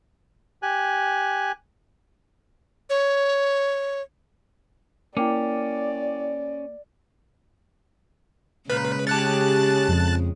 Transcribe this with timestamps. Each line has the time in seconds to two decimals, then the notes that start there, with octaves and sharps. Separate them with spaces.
0.62 G4 G#5 F#6
2.90 C#5
5.17 A#3 C#4 E4 D5 G5 D6
8.70 A#2 C#3 G#3 B4
9.07 C#4 G4 A5 F#6 A6
9.88 F2